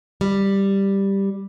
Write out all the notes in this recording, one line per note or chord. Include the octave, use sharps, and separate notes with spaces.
G3